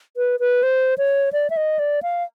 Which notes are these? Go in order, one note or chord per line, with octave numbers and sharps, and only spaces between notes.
B4
B4
C5
C#5
D5
E5
D#5
D5
F5